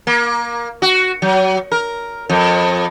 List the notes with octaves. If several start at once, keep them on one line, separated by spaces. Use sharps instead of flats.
A#3
F#4
F#3
A#4
F2